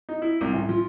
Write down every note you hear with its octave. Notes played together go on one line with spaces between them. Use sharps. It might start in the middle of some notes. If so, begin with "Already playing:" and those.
D#4
E4
C2
A1
F3